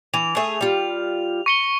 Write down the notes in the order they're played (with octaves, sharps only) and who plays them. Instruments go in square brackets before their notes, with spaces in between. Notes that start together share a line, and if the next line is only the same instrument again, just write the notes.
[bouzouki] E3 [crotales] F7
[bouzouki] A3 G#4 E5
G3 F4
[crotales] C#6 C#7 G7